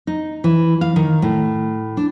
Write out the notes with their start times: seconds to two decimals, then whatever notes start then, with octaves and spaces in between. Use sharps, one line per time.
0.07 D#4
0.44 E3
0.81 F5
0.96 D#3
1.22 A2
1.97 D4